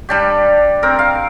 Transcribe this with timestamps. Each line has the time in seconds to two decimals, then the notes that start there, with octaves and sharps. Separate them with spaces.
0.09 G3 D4 G4
0.83 C4 A#4
0.99 F5